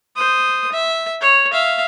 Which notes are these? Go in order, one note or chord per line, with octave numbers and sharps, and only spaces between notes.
C5 D#6
E5
C#5
E5 F5